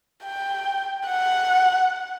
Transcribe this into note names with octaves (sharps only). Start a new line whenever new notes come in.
G5
F#5